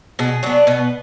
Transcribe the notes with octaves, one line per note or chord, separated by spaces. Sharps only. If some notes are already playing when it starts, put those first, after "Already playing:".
B2 G#4
F#3 B3 D4
B2 B3